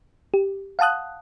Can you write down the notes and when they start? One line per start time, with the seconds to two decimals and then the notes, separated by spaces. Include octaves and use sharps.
0.34 G4
0.79 F5 F#5 A5 D#6 F#6